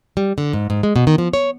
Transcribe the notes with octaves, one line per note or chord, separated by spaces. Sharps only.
G3
D3
G#2
G#2
G#3
B2
D#3
F3
C#5